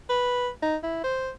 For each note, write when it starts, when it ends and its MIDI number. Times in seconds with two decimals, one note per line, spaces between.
0.10 0.49 71
0.62 0.76 63
0.83 1.04 64
1.04 1.31 72